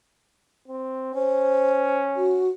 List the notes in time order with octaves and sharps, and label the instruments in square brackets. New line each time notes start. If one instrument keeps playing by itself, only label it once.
[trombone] C4
[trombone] C#4 [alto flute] C5
[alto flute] F#4